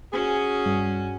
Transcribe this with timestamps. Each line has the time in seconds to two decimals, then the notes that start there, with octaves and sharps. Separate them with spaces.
0.13 C#4 F#4 G#4
0.66 G2